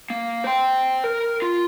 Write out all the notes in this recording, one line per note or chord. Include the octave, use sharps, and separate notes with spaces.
A#3
C5 G5
A#4
F4